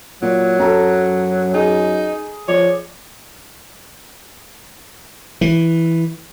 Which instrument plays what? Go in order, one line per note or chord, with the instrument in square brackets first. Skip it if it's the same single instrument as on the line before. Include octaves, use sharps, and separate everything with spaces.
[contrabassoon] A#2 [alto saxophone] F#3
[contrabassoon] F#2 [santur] A4 A#5
[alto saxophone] D#4 [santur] G#4
[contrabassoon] F3 [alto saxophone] C#5 [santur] D5
[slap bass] E3